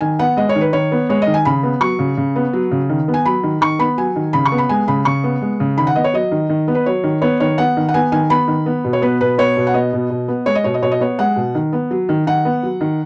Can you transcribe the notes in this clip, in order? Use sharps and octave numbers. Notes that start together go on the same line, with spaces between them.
D#3 G#5
B3 F#5
G#3 D#5
C#5
D#3
B4
D#3 C#5
B3
G#3 C#5
D#3 D#5
G#5
C#3 B5
B3
F#3 C#6
C#3
C#3
B3
F#3
C#3
D#3
B3
G#5
F#3 B5
D#3
D#3 C#6
B3 B5
F#3 G#5
D#3
C#3 B5
C#6
B3
B5
G#3 G#5
C#3 B5
C#3 C#6
B3
G#3
C#3
D#3 B5
F#5
B3 D#5
C#5
F#3 D#5
D#3
D#3
B3
B4
F#3 C#5
D#3
B3 C#5
D#3 C#5
B3 F#5
D#3
F#5
B3 G#5
D#3 G#5
B3 B5
D#3
B3
B2
C#5
B3 B4
B2 B4
B3 C#5
B2
F#5
B3 D#5
B2
B2
B3
G#3 C#5
D#5
B2 C#5
D#5
B2 C#5
D#5
B3 C#5
G#3 F#5
B2
D#3
B3
F#3
D#3
D#3 F#5
B3
F#3
D#3